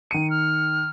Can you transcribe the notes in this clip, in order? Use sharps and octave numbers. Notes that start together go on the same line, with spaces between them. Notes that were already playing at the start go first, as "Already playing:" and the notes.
D#3 C#7 D#7
F6